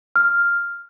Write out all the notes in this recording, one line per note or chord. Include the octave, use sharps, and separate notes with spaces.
F6